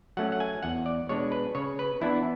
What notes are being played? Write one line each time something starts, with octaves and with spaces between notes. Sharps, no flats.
F#3 A3 C#4 F#5
F#5
G#5
E2 F#5
D5
B2 G#3 D4 C#5
B4
C#3 C#5
B4
E3 B3 D4 E4